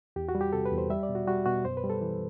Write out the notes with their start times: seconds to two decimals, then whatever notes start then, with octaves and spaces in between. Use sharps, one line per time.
0.16 E2 G4
0.29 F#4
0.35 G3
0.41 G4
0.53 C3 A4
0.66 B4
0.72 E2
0.78 C5
0.90 G3 E5
1.03 D5
1.09 B2
1.15 F#4
1.27 G3 F#4
1.46 B2 F#4
1.65 F#2 C5
1.77 B4
1.84 G3
1.90 A4
2.01 E3